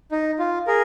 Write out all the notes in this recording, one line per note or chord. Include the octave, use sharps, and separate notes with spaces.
D#4
F4
G#4 A#4